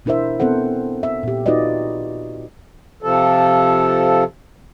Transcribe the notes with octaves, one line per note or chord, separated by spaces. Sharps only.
B2 D4 E4 A#4 C5 E5
B3 C4 A4 C5 F#5
E5
A#2 G4
D#4 F4 F#4 B4 D5 D#5
C3 F3 A4